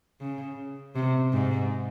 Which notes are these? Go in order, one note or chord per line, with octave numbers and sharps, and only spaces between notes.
C#3
C3
G#2